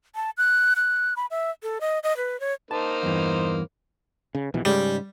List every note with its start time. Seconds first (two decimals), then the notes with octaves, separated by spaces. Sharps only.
0.15 A5
0.37 F#6
0.76 F#6
1.16 B5
1.31 E5
1.63 A4
1.80 D#5
2.03 D#5
2.17 B4
2.40 C#5
2.71 A#3 D#4 C5 A5
3.03 E2 G2 E3
4.35 C#3
4.54 A#1 B2 E3
4.65 G#2 C#3 G3 G#3